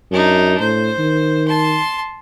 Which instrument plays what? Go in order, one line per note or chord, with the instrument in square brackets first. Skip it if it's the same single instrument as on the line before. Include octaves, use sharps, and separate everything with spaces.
[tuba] F#2 [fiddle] D4 D#4
[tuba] A2 [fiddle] C5
[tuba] D#3
[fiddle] A5 C6